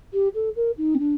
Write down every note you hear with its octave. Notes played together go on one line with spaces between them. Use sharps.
G4
A4
A#4
D#4
C4
D4